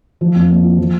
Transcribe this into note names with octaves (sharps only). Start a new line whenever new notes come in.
F3
F2
A#3
F4
F3